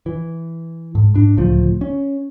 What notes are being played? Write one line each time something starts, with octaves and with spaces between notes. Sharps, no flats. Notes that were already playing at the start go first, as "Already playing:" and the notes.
E3
G#2
G#2 D4
D1 C#2 F3 A3
C#4